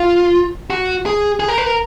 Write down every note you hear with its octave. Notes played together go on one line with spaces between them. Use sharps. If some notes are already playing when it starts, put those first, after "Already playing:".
Already playing: F4
F#4
G#4
G#4
A#4
B4
A#4